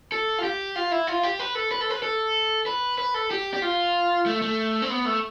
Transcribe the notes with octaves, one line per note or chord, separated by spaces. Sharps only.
A4
F4
G4
F4
E4
F4
G4
B4
A4
B4
A4
B4
A4
B4
B4
A4
G4
G4
F4
A3
A3
C4
B3
A3